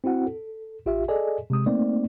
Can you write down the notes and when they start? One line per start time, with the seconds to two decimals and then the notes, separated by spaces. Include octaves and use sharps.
0.04 C4 E4 F#4 F#5
0.26 A4
0.86 A1 F4 G4 E5
1.08 G#4 A4 D5 D#5 G#5
1.50 C3 G#3 D#6
1.66 A3 A#3 C4 D#4 D5